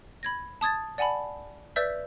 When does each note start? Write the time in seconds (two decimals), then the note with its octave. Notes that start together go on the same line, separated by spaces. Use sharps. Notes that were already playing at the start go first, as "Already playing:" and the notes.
0.23 B5 G#6 A#6
0.61 A5 D#6 G#6 A6
0.98 D5 F#5 G#5 A5 B5
1.76 B4 D5 E5 E6 G6 B6